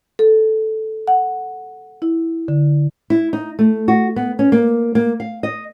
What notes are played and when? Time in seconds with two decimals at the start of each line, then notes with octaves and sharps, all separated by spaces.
0.19 A4
1.08 F#5
2.02 E4
2.48 D3
3.10 E4
3.33 D#4
3.59 A3
3.88 F#4
4.16 B3
4.39 C#4
4.52 A#3
4.95 A#3
5.20 F5
5.43 D#5